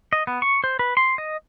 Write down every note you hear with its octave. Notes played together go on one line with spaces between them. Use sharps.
D#5
B3
C#6
C5
B4
C6
D#5